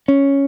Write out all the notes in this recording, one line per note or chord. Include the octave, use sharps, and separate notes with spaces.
C#4